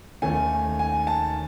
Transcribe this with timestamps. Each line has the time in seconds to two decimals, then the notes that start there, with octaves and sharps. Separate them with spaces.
0.22 D#2 D#3 A3 C#4 G#5
0.79 G#5
1.07 A5